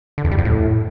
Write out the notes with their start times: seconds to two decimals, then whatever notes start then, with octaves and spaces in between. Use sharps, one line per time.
0.18 D3
0.25 E2
0.31 G3
0.38 F2
0.45 A2